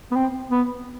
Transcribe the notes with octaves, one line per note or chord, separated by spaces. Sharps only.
B3
C4
B3